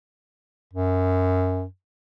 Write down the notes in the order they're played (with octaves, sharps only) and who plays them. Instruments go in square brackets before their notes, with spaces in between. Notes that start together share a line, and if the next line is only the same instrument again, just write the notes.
[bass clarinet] F#2